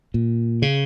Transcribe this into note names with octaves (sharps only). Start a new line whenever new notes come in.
A#2
C#3